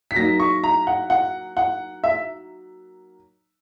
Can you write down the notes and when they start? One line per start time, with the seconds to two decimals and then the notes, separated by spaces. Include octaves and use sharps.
0.11 B6
0.16 F#3 A#3 D#4 A#6
0.40 C#6
0.64 A#5
0.87 F#5
1.10 F#5
1.57 F#5
2.04 E5